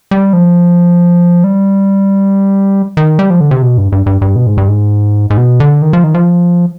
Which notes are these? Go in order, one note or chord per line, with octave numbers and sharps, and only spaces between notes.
G3
F3
G3
D#3
G3
F3
D3
C3
B2
G2
G2
G2
G2
B2
G#2
G2
G#2
G#2
B2
D3
D#3
F3
D#3
F3